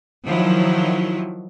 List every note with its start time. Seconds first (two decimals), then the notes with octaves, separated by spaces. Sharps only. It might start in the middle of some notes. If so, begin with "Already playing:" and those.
0.24 D#3 F3 F#3 E4